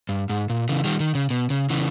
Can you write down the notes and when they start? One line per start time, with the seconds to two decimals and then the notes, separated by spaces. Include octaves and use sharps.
0.09 G2
0.29 G#2
0.50 A#2
0.69 C#3 E3
0.84 D#3 G3
1.00 D#3
1.15 C#3
1.30 B2
1.50 C#3
1.70 C#3 E3